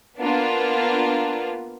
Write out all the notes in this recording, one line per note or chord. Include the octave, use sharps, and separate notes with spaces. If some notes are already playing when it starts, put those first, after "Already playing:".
A#3 B3 D4 F4